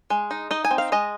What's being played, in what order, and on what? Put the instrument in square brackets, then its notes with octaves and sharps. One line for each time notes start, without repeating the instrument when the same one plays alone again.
[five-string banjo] G#3
D#4
D#4 D#5
G#5
C4
F5
G#3 D#5